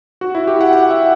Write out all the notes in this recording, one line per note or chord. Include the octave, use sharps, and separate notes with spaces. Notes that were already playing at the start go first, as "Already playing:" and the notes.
F#4
E4
G4
F#5
F#5
E5